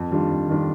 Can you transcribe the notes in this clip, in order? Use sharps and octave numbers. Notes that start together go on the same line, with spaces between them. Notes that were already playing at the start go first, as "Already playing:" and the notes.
Already playing: F2
D#3 G3 D4 F4
F2
D#3 G3 D4 F4